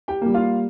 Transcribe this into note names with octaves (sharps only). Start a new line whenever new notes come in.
G4 G5
G3 A#3
F4 F5